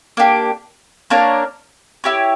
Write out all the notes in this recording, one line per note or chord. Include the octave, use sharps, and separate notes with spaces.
A#3 D4 G4
A#3 D4 A#4 C#5
E4 G4 C#5